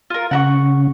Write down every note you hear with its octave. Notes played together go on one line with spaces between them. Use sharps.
F4 A#4
C#3 F#5 A#5 C#6